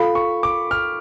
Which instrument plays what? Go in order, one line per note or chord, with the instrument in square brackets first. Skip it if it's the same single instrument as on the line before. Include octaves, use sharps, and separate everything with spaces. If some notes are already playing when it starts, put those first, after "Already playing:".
Already playing: [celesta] F4 A4 F5 [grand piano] B5
[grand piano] C#6
D6
F6